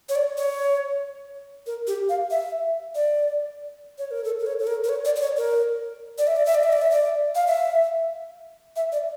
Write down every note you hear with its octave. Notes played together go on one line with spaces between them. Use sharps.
C#5
D5
C#5
A#4
G4
F5
E5
D5
C#5
A#4
A4
A#4
C#5
A4
A#4
A#4
C#5
D5
D5
C#5
A#4
D5
E5
D5
E5
D5
E5
D5
E5
D5
F5
E5
E5
D5